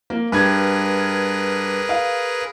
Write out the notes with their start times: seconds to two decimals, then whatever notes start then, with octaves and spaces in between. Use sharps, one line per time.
0.10 A#3
0.32 G2 G#4 A#4 B4 G#6
1.89 F5